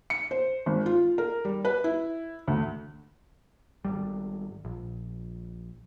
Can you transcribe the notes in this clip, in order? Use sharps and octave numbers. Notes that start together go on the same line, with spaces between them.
C#7
C5
G#1
F4
A#4
G3
B4
E4
D2
G#1 C#2 G3
A#1